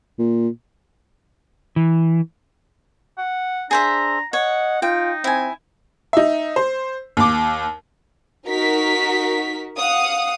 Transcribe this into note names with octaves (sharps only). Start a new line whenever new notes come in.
A#2
E3
F#5
D4 G#4 C5 E5 A#5
C#5 D#5 F#5
D#4 F4 G5
C4 E4 G#5
D#4 E5
C5
D#2 D6
D#4 F#4 A#4 B6
F5 F#5 D#6